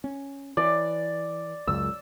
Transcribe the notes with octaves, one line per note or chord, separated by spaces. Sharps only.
C#4
E3 D5
C#2 F#2 E6